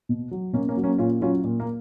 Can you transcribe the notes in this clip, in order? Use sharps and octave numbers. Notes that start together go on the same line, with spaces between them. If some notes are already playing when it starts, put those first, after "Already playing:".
B2
F#3
B2 A#3 C#4
A#3 C#4
F#3
A#3 C#4
A#2 C#4 F4
F#3 C#4 F4
A#2
A#3